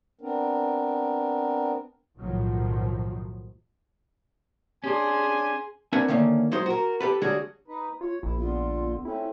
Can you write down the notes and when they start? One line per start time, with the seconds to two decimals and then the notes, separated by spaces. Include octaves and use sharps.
0.21 B3 C4 D4 A#4
2.18 B1 F#2 A2 D#3 F3 F#3
4.84 C#4 D4 G#4 G#5 C6
5.92 C4 D4 A#4 B4 F#5 G#5
6.08 D3 D#3 A3 A#3 C#4
6.52 F#3 G#3 D#4 C5
6.66 F#4 A#4
7.01 G4 A4 B4
7.21 D3 G3 G#3 C#4 F#4 G#4
7.68 D#4 B4
8.01 F4 C#5
8.23 A#1 E4
8.38 D3 B3 F4
9.05 A3 C4 C#4 E4 A4